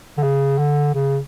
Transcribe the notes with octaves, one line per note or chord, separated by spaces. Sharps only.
D3
C#3
D3
C#3